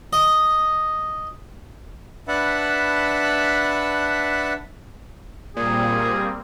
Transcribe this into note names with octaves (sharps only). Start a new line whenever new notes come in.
D#5
D4 B4 E5 F#5 A5 B5
A#2 G3 A#3 C4 G#4